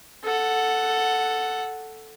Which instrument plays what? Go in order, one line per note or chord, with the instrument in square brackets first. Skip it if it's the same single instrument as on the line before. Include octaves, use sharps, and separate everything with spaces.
[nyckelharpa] A4 F#5